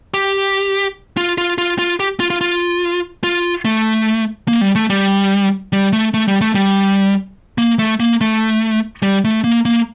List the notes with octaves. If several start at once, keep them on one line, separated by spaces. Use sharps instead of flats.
G4
F4
F4
F4
F4
G4
F4
F4
F4
F4
A3
A#3
G3
A3
G3
G3
A3
A3
G3
A3
G3
A#3
A3
A#3
A3
G3
A3
A#3
A#3